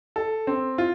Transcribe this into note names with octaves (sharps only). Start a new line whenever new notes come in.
A4
C4
F4